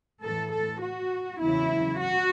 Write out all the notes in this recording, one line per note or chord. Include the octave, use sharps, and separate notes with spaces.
A2 E3 A4
A4
F#4
E2 C#3 F#3 E4
F#4